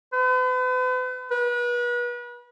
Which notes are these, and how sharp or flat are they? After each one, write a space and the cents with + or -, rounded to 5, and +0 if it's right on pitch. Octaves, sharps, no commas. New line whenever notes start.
B4 +40
B4 -35